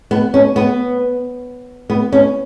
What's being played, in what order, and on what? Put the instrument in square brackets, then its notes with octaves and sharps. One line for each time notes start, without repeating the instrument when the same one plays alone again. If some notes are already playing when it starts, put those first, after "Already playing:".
[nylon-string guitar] B3
C#4
B3
B3
C#4